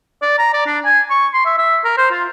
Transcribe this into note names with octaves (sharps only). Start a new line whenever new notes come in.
D5
A#5
D5
D4
G#5
C#6
C6
E5
E5
A#4
C5
F4